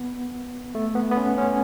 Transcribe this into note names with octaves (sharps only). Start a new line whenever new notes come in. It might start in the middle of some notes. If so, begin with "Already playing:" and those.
Already playing: B3
A3
B3
B3
C#4
C#4